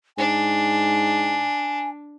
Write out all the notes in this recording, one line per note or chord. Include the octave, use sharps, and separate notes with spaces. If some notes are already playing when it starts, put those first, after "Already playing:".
G#2 D4 G#5